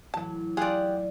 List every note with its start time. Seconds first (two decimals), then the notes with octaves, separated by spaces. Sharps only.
0.14 A2 E3 F#3 A5
0.57 F4 G4 G#4 D5 F#5 G#5